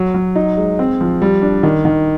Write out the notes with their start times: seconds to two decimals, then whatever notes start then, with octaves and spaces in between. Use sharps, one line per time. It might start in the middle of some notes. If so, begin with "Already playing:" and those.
Already playing: F#3
0.14 F#3
0.36 D#4
0.57 G#3
0.79 C4
1.01 F3
1.22 G3
1.42 D4
1.63 D#3
1.85 D#3